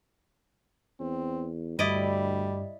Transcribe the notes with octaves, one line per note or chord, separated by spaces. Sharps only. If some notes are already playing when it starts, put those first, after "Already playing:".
E2 C4
D2 G2 G3 E4 D5 D#5